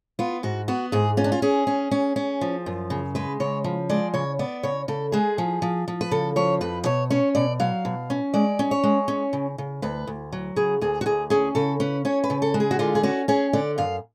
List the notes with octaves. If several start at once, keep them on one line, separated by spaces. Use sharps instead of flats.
B3 F4
G#2 F#4
B3 F#4
G#2 G#4
C#4 F4
D4
F4
C#4 G#4
C#4
C#4
C#4
F3
F#2
C#3
G#3 B4
C#3 C#5
F3
G#3 D5
C#3 C#5
B3 D5
C#3 C#5
C#3 A4
G#3 G#4
F3
F3
F3
B4
C#3 A4
F3 C#5
F2 B4
B2 C#5
C#4 C#5
B2 D5
F#3 F5
B2
C#4
G#3 D5
C#4
C#5
G#3
C#4
C#3
C#3
D2 B4
D2
F#3
C#3 G#4
D2 G#4
F#4
D2 G#4
C#4 G#4
C#3 A4
C#4 B4
C#4 C#5
B4
C#3
A4
G#3
G#4
F#4
D3 F4
G#4
C#4 F#4
C#4 G#4
D3 D5
F#2 F5